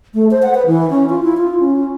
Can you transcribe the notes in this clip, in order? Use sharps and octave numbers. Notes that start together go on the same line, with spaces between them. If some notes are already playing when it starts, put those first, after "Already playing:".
A3
C5
F#5
B4
E3
C#4
F4
E4
F4
C#4